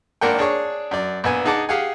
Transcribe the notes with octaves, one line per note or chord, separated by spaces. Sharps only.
G#1 A#3 D4 A#4 F#5 G5
D4 G#4 C#5
F#2 D5
A#1 B3 G#5
D#4 G#4 F#5 A5 D6
G4 G#4 F5 F#5 G#5